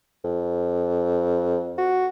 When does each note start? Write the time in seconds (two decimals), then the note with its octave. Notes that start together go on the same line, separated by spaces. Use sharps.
0.24 F2
1.78 F#4